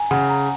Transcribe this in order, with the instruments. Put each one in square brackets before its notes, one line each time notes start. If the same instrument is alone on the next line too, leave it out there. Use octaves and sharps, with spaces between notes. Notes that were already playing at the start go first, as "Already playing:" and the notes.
Already playing: [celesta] G#5 A#5
[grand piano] C#3 [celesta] F#5
[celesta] A#5